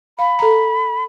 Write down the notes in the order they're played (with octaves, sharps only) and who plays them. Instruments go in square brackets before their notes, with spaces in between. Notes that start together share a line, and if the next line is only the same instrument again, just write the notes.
[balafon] F5 [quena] B5
[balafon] A4 A#5